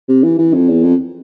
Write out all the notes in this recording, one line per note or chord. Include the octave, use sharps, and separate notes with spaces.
C3
E3
E3
F2
E2
F2